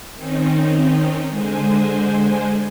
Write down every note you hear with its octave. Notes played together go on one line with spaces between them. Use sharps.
D#3 C4 C#4 D#4
D3 G#3 C5 G#5